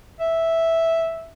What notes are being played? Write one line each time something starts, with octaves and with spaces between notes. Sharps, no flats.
E5